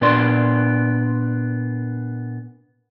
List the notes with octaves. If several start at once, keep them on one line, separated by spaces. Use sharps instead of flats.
A#2 B3 D4 D5 C6